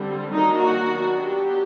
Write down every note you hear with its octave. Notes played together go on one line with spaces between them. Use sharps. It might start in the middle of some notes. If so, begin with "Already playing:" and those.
Already playing: D3 G3 C4
D#3 F#3 A#3 D4 D#4
F#4
F#3 B3 D4
G4